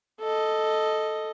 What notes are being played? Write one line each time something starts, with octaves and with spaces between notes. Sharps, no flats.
A4 D#5